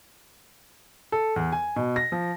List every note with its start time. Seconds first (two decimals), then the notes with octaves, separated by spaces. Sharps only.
1.12 A4
1.36 E2
1.52 G#5
1.76 B2
1.96 A#6
2.12 F3